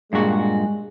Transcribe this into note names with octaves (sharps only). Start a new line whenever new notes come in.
G2 A#2 G#3 F#4